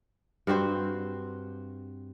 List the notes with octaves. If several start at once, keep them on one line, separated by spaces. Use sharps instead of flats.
G2 C4 F#4 C5